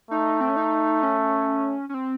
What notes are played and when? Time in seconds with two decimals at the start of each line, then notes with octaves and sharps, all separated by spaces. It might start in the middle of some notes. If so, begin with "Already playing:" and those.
0.10 A3 D#4
0.41 C4
0.49 C#4
0.56 D#4
1.03 C#4
1.89 C#4
1.94 C4